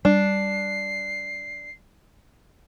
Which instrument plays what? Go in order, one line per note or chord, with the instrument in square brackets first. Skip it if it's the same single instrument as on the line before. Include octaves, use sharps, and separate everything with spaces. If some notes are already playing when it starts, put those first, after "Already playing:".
[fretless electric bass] G3 [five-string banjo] D4 [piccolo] C7